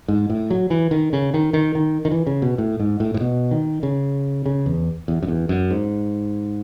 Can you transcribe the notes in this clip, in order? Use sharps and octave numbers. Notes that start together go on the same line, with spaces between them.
G#2
A2
F#3
E3
D#3
C#3
D#3
D#3
D#3
D#3
E3
C#3
B2
A2
G#2
A2
A2
B2
D#3
C#3
C#3
E2
E2
F#2
E2
F#2
G#2